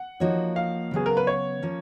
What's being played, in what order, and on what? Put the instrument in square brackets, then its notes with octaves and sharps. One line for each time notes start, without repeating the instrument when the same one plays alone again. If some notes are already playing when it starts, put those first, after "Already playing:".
Already playing: [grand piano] F#5
[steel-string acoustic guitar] F3 A#3 D#4 F#4 C#5
[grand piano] F5
[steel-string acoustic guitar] C#3 F#3 B3 [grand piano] G#4
[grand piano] A#4
B4
C#5
[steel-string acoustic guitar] F3 A#3 C#4